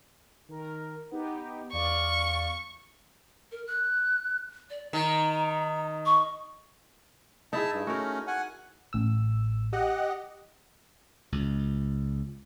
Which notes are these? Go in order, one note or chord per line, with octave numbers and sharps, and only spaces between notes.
D#3 A#4
B3 D#4 G4
E2 D5 F5 C#6
A#4
F#6
D5
D#3 A#5
C#6
D#4 E4 G#4 E5 A5
G2
A3 C#4 F#4 A#4
F#5 G#5
A1 E6
G4 D#5 F#5
C#2